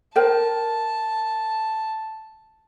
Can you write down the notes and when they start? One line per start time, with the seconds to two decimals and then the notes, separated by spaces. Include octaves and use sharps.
0.16 A#4 C5 G5 A5